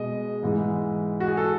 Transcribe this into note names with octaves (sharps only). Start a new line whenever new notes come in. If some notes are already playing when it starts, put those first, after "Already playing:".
Already playing: B2 G#3 D#5
G#2 E3 G#3
F#4
G#4
A4